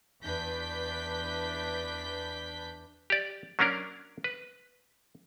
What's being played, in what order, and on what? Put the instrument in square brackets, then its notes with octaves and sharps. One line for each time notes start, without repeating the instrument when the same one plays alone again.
[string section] E2 D4 B4 G6 B6
[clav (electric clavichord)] G4 D5
F#3 A#3 C#4 D4 A#4
B4